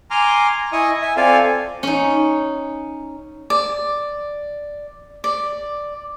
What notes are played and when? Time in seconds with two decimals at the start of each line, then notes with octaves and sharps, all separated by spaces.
0.11 G#5 A#5 C6 D6 F6
0.72 E4 D#5 G#5 C#6 D#6
1.02 E5 G#5
1.17 C4 F4 A4 D5 F5 G#5
1.83 C#4 D#4
3.50 D5
5.24 D5